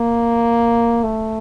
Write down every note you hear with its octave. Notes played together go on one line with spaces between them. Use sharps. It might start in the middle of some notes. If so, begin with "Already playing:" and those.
Already playing: A#3
A3